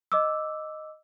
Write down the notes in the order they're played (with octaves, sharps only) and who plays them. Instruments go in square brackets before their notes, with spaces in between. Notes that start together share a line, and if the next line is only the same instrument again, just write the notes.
[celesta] D#5 D6 E6